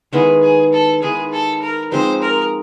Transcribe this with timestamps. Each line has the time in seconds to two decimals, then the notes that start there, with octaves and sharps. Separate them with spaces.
0.13 D#3 G#3 B3 E4 G#4
0.42 G#4
0.73 A4
1.02 D#3 G#3 B3 E4 G#4
1.32 A4
1.62 A#4
1.92 F3 G#3 C4 D#4 C5
2.22 A#4